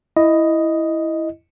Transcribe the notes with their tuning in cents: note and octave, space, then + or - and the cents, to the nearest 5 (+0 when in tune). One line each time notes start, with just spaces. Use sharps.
E4 +0 D#5 +0